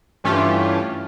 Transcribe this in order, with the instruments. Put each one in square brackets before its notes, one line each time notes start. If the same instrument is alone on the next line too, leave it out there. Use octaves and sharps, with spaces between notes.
[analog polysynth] G2 E3 A3 C#4 F4 G4